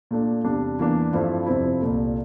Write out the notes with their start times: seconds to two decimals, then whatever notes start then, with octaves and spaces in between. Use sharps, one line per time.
0.11 A#2 A3 D4
0.44 E2 C3 G3 D4
0.79 E2 E3 A#3 D4
1.13 G2 F3 A3 C4 E4
1.46 F2 C3 F3 C4 E4
1.81 C2 A#2 A3